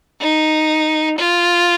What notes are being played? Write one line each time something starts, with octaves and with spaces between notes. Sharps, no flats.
D#4
F4